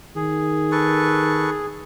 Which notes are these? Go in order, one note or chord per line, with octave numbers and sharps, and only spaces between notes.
D#3 G#4
A4 B4 C#6